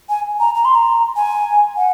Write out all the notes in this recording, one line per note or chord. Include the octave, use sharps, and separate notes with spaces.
G#5
A#5
A#5
C6
A#5
G#5
F#5